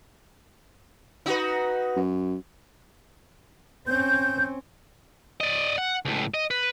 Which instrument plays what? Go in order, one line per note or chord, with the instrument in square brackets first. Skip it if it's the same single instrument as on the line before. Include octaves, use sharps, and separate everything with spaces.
[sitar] D#4 F#4 B4
[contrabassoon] F#2
[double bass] C4 C#4 [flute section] G6
[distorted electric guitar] D5 D#5
F#5
C#2 A2
D#5
B4